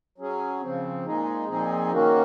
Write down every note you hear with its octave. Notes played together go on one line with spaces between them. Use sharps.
F#3 C#4 G#4
C#3 F3 C4
A#2 G#3 D#4 G#4
A#2 F3 C4 D#4 G#4
D#3 A#3 C#4 F#4